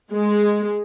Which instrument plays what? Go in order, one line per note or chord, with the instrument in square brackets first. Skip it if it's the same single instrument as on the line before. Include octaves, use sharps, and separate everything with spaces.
[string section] G#3